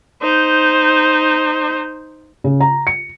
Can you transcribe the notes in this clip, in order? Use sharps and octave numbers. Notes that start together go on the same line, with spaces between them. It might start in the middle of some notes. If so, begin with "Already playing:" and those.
D#4 C5
C#3
A#5
C#7